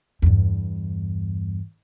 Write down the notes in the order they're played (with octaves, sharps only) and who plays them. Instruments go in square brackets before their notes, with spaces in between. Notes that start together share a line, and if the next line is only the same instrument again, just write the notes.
[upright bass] E2 G2